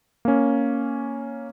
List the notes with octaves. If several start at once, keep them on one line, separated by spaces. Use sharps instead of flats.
A#3 C#4